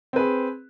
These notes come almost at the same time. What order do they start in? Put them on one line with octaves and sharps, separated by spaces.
C4 B4 G#4